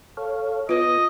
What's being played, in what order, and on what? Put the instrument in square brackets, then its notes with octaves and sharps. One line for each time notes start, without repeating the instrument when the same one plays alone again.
[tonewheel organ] A4 C#5 F5
[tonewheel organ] B3 [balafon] F4 B4 [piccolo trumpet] D#5